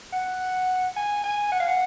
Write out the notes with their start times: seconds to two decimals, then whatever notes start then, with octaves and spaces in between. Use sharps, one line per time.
0.13 F#5
0.96 G#5
1.24 G#5
1.52 F#5
1.60 F5
1.68 F#5